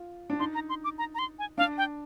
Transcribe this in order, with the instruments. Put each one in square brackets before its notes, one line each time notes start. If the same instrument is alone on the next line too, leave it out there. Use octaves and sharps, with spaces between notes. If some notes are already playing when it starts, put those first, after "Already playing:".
Already playing: [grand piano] F4
D4
[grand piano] D#4 [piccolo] C6
[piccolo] A#5
C6
D6
A#5
A#5
C6
G#5
[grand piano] D4 [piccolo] F5
[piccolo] G5